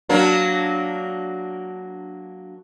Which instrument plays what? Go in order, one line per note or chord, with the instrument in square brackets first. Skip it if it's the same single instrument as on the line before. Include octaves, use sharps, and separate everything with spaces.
[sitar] F#3 A#3 D4